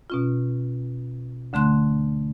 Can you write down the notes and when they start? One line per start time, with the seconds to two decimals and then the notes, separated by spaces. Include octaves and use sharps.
0.10 B2 C#4 F4
1.53 D2 D3 A3 C6 F#6